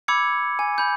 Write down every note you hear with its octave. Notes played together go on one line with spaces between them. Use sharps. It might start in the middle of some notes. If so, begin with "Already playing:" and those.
B5 D6 E6 G#6 C#7
G#5
B5 G6